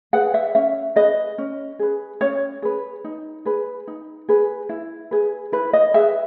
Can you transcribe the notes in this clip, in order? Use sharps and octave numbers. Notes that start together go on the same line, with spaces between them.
G#4 B4 F#5
E5
C#4 E5
G#4 B4 D#5
C#4
G#4 B4
C#4 C#5
G#4 B4
D#4
G#4 B4
D#4
G#4 B4
E4
G#4 B4
E4 B4
D#5
G#4 B4 E5